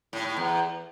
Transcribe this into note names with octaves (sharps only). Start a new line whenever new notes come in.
A2
A2
E2